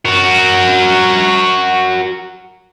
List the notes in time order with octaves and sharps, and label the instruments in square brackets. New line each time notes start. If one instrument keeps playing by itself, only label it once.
[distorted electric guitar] F#4 A#4